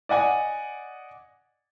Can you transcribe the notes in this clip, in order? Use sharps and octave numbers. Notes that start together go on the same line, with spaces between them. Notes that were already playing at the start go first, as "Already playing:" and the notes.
D5 D#5 F#5 G#5